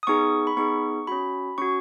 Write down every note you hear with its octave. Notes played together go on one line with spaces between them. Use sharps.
D#6
B3 D#4 G#4 C#6
B5
B3 D#4 G#4 C#6
C#4 F#4 B5
C#4 F#4 C#6